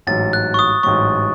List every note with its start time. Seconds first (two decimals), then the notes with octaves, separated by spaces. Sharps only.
0.07 A1 G#2 F#3 A6
0.33 F#6
0.54 C#6
0.59 D#6
0.83 A1 G#2 F#3 C#6